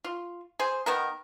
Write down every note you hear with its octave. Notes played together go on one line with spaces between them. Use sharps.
F4
G#4 C5
D#3 B3 A#4